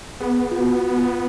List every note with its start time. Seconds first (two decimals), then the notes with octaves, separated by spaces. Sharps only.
0.20 B3 G#4
0.51 F4
0.59 F#4
0.98 F4